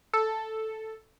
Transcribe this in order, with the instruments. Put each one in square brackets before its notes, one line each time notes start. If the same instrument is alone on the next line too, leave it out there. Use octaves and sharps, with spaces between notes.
[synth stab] A4